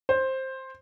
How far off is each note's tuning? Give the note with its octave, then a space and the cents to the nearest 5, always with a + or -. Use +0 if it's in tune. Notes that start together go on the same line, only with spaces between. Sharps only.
C5 +10